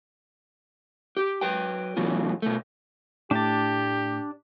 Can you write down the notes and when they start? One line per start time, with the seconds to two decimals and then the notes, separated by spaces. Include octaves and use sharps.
1.17 G4
1.41 F#3 B4 G5
1.97 A2 E3 F#3 B3 F4
2.42 B2 A3
3.31 A2 A3 D4 G4 A5